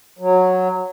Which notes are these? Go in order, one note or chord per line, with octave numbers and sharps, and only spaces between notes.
F#3